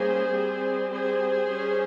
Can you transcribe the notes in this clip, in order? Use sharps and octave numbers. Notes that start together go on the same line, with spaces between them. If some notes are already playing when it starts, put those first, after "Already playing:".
Already playing: G3 A#3 C#4 G#4 C5
G3 C4
G#4 C5
G3 C#4